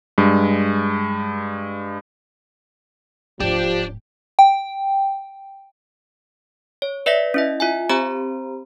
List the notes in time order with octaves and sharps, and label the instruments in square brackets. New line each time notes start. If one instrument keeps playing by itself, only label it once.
[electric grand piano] G2 G#3
[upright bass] D1 G#2 [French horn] F3 [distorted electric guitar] D4 [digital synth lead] G4
[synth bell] G5
[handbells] C#5
B4 D5 E5 A#6 B6
C#4 E4 D#5
F4 E5 G#5
C4 G4 C5 A#5 B5